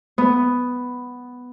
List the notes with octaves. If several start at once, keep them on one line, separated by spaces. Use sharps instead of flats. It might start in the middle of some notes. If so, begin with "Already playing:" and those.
B3